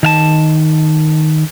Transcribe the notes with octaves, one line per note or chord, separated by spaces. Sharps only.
D#3 F5 A5